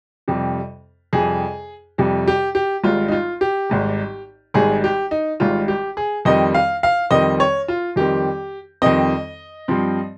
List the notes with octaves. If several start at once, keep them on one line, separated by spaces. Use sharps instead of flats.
F2 C3 G3
F2 C3 G3 G#4
F2 C3 G3
G4
G4
G#1 G#2 G3 F4
D#4
F4
G4
G#1 G#2 G3
G#1 G#2 G3 G#4
G4
D#4
G#1 G#2 G3 F4
G4
G#4
F2 D#3 G3 C4 D#5
F5
F5
F2 D#3 G3 C4 D#5
C#5
F4
F2 D#3 G3 C4 G4
F2 D#3 G3 C4 D#5
G2 F3 C4